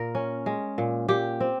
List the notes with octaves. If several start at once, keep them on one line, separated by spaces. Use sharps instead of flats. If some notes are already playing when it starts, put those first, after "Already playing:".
Already playing: A#2 A#4
C#4
G#3
A#2
A#2 G4
C4